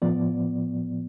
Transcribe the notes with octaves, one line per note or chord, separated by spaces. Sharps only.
A2 F3 B3 D5